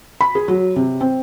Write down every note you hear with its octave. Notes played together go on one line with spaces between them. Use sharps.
B5
G#4
F#3
C3
C4